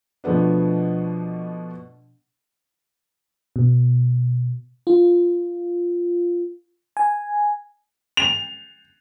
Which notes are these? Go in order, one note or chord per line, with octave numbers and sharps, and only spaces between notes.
B2 F3 A3 B3 D4
B2
F4
G#5
F7